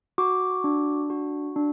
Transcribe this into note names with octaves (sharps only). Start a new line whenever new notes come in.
F#4 D6
D4
F#4
D4